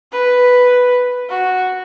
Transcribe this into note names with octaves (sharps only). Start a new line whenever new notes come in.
B4
F#4